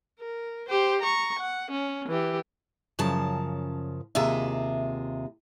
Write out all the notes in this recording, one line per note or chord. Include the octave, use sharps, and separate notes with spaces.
A#4
G4 C5
A#5 C#6
F#5
C#4
E3 G4
F#2 C#3 F3 A5
D#2 C3 F4 G#4 E5